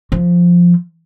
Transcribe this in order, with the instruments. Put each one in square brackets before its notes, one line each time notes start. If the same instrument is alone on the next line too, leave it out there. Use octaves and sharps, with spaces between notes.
[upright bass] F3